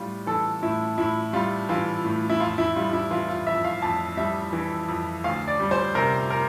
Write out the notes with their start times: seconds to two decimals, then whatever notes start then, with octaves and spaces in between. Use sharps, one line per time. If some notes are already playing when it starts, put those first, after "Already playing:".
Already playing: A2 G3 F4
0.27 E3 A4
0.62 A2 E4
0.98 A2 E4
1.33 G3 F4
1.69 E3 F4
2.04 A2
2.30 E4
2.40 F2 F4
2.58 E4
2.75 G3 F4
2.93 E4
3.11 E3 F4
3.28 F4
3.46 F2 E5
3.65 F5
3.82 F2 A5
4.17 G3 E5
4.53 E3
4.88 F2
5.24 D2 F5
5.48 D5
5.60 G3
5.71 C5
5.95 C3 A#4
6.30 A#4